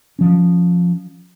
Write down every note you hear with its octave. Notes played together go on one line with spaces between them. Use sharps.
F3 C#4